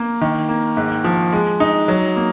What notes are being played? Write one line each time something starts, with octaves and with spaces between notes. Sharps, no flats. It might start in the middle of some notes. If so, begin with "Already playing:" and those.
Already playing: A#3
D#3
A#3
G#2
F3
G#3
D#4
F#3
A#3